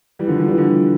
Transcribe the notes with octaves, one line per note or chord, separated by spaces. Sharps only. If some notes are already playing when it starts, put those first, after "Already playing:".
E3 G3
D3 F3
D3 F3
E3 G3
D3 F3